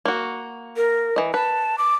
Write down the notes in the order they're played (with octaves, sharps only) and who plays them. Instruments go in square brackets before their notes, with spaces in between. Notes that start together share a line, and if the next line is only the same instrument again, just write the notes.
[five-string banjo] A#3 F#4
[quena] A#4
[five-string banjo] E3 D#5
[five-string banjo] B4 [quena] A5
[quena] D6